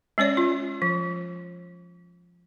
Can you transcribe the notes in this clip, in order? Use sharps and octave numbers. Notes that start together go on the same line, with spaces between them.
G#3 C#4 C#5 D5
F4
F3